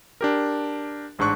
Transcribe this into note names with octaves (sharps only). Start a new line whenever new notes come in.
D4 G4 A#4
A1 G#2 D4 C#6 F#6